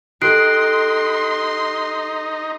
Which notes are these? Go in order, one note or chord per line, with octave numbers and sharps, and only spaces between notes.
D#4 G4 A4 C6 F#6 C7 D7